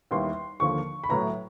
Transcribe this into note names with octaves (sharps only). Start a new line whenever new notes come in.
D#2 D#3 G3 B3 E4 C6
D#2 D3 F3 A#3 C#6
B5
A2 F#3 B3 E4 A#5